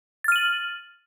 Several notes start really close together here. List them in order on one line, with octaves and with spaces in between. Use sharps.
A6 F6 D#7 F#7